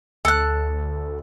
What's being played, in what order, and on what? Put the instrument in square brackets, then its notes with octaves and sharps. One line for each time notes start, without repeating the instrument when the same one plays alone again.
[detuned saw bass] D2 [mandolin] A4 F#6